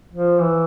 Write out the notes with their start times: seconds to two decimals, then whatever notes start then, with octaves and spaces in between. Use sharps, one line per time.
0.13 F3
0.40 E3